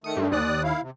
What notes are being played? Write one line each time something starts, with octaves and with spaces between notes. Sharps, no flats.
D#3 A3 D#6 C#7
G2
D#2 D5 D#6 F#6
E4 F5
C3